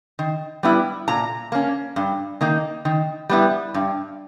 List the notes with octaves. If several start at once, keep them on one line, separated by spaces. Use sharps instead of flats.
D#3
G3 B3 E4
A#2 A#5
A#3 C#4
G2
D#3 A#3 D#4
D#3
G3 B3 E4
G2